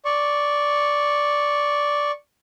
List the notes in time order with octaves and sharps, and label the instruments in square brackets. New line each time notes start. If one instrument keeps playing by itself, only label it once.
[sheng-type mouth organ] D5 C#6